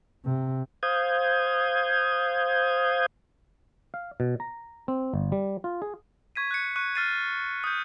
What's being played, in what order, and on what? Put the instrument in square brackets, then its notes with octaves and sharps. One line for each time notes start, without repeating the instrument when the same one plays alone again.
[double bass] C3
[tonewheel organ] C5 F5 D#6 G6 G#6
[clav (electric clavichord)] F5
B2
A#5
C4
G1
G3
F4
G#4
[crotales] C#6 G#6 B6 D#7
F#6 C#7
C#6 F#6 D#7
F6 G#6 A6 C7 D#7
D#6 G6